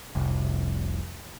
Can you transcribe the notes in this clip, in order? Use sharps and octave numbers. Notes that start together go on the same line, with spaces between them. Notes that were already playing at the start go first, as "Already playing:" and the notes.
F1 C2